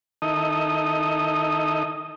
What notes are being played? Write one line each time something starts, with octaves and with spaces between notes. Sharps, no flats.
D#3 D#4 E4 A4 D#5 D#6